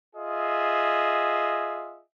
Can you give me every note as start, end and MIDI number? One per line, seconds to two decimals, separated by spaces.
0.15 2.02 65
0.15 2.02 68
0.15 2.02 75
0.15 2.02 76